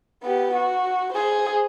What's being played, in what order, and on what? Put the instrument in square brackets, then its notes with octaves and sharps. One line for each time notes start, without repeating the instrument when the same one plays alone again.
[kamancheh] B3 G4
F#4
G#4 C5